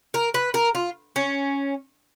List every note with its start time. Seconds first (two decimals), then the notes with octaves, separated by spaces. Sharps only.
0.14 A#4
0.34 B4
0.54 A#4
0.75 F4
1.16 C#4